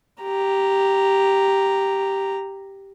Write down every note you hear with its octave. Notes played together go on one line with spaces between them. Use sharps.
G4 A#5